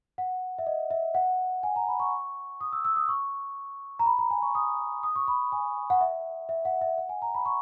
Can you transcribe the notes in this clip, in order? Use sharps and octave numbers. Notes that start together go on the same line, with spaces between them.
F#5
E5
D#5
E5
F#5
G#5
A#5
B5
C#6
D#6
E6
E6
D#6
C#6
A#5
B5
A#5
G#5
C#6
D#6
D#6
C#6
B5
G#5
F#5
E5
E5
F#5
E5
F#5
G#5
A#5
B5
C#6